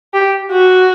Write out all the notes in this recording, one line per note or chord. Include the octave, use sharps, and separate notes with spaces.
G4
F#4